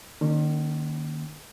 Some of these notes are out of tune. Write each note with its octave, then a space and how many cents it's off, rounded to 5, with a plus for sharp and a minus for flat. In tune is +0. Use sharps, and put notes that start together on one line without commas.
D#3 -35 A#3 -10 C#4 +0